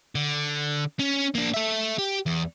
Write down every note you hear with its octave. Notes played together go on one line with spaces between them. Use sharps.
D3
C#4
A#3 D4
A4 E5
G4
E2